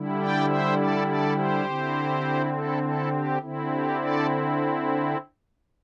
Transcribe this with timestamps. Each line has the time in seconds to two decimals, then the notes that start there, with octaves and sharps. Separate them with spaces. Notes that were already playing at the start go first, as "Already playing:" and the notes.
Already playing: D3 G3 E4
0.19 D5 G5
0.48 C5 E5
0.78 A4 D5
1.07 A4 D5
1.36 G4 C5
1.65 D3 C4 E4
2.53 E4 A4
2.83 E4 A4
3.12 G4
3.42 D3 C4 E4
3.71 G4
4.00 A4 D5